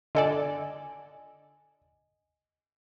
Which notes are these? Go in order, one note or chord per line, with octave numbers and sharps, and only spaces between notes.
D3 A4 D5 D#5 G#5